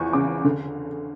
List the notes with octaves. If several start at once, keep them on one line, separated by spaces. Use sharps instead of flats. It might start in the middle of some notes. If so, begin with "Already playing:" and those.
Already playing: E2 F3 C#6
C#3 D6
D3